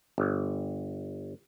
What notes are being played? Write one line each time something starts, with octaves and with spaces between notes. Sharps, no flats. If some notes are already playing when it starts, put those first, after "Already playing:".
G1